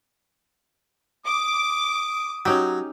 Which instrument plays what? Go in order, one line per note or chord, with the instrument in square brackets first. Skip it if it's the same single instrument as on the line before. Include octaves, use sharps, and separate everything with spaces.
[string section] D6 [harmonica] D#6
[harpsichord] F#3 [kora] C#4 D#4 G4